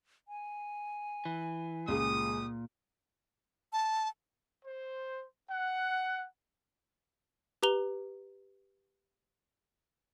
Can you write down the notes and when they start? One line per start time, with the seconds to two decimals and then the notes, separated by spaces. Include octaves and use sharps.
0.28 G#5
1.25 E3
1.88 C#2 A#2 G3 G#4 D#6
3.73 A5
4.64 C5
5.48 F#5
7.63 G4 B4 A#5 F7 G7